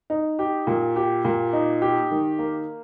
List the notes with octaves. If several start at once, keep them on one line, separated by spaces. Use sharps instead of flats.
D#4
G4
A#2
G4
A#2
D#4
G4
D#3
A#3